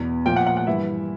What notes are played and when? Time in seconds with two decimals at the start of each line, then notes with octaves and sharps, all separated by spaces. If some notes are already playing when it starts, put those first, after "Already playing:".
Already playing: E2 B2
0.26 A#2 F3 G5
0.36 F#5
0.46 F#5
0.57 F#5
0.67 G2 E3 E5